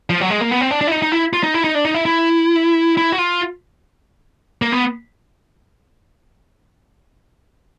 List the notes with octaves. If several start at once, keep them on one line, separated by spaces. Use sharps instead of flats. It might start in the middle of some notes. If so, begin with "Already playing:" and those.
F3
F#3
G#3
A#3
B3
C4
D4
D4
E4
D#4
D#4
E4
F4
D#4
E4
D#4
D4
D#4
E4
E4
E4
F#4
F4
A#3
B3